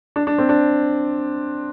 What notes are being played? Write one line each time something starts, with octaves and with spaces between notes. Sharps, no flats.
D4
D4
C4
D4